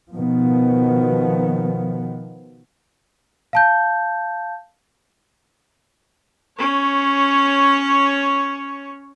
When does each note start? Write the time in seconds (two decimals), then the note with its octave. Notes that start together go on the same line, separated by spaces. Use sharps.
0.14 B2 D#3 F3 B3
3.53 F5 A5 G6
6.58 C#4 C#5